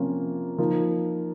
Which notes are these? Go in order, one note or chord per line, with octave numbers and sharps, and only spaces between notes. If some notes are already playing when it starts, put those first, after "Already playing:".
Already playing: C3 F3 A#3 C#4 F4
F3 A#3 D#4